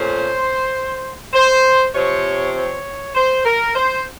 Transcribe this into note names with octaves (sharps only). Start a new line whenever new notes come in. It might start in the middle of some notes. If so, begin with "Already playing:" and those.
Already playing: A#2 A3 C#4 C5
C5
C3 F3 C4 C#5
C#5
C5
A#4
C5